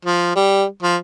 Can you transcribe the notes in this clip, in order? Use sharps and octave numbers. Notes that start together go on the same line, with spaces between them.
F3
G3
F3